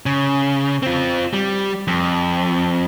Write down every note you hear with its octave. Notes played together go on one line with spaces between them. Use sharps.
C#3
C4 F4
G3
F2